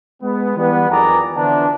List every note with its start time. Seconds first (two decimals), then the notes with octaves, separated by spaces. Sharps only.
0.22 G#3 B3
0.56 E3 G3 B3
0.90 F2 D#3 G#4 D5 A#5
1.35 D3 E3 F3 B3 D4